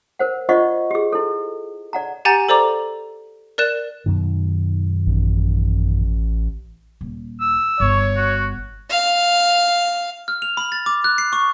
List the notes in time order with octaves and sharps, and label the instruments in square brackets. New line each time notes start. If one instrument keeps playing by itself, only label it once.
[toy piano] A#4 C5 F#5
F4 C5 D5 D#5 F#5 C#6
G4 G#4
E4 A4
D5 F#5 A#5
[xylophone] G4 F#5 G#5 A#5 G6 A6
A4 C5 D5 A#5 D6
A#4 D5 F#6 E7
[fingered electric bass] F#2 B2 D#3
[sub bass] A1
[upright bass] D#1
[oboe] E6
[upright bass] G1 [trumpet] C#5
[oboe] F#4
[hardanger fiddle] F5
[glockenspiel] F6
F7
B5
A6
D6
F#6
C7
C#6